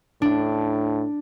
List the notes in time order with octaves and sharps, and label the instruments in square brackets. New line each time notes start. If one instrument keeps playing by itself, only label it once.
[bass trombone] A2 [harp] D4